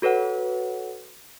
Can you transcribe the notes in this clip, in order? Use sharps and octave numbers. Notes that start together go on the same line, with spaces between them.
F#4 A4 B4 C#5 F#5